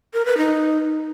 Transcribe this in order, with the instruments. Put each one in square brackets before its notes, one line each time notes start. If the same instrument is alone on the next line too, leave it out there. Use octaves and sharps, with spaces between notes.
[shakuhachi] A#4
B4
D#4